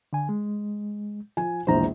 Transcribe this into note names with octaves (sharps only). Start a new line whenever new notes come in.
D3 G#5
G#3
F3 G#5
E1 A#1 E3 C5 A#5